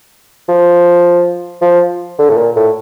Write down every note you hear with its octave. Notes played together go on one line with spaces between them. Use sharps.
F3
F3
D3
A2
A#2
A2